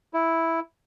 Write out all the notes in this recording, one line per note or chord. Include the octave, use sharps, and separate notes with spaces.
E4